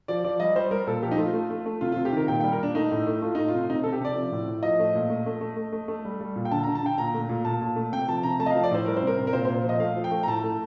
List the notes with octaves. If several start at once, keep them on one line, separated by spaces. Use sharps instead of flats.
F3 D5
F3 D5
G3 D#5
G3 C5
G3 A#4
A#2 A4
F3 G4
D#4
A3 F4
A3
A3
A3
C3 F4
F4
C3
G4
D#3 A#4
A#2 G5
G3 G5
A#4
A#2 D4
A3 D#4
A2
A3
A3 F4
A3 D#4
F4
C3
C3 D#4
C3 A4
G4
C3 D5
F3
A2
A2
F3 D#5
A3
A#2
A3
A3
A3
A3
A3
A3
G3
G3
A#2
G5
D3 A5
A#5
D3
A5
D3 G5
A#2 A#5
A3
A#2
A#2 A5
A#2
A3
C3 G5
F3 A5
C3 A#5
A3 A5
D#5
F5
F3
D5
A2 C5
G3 A#4
C5
C3 A#4
C3
A#4
A#2 C5
C5
A#2
F3 D#5
A3 F5
F3
G5
A3
A#5
A2 A5
A3